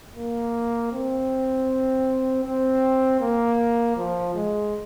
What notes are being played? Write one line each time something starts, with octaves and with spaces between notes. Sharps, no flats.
A#3
C4
C4
A#3
F3
G#3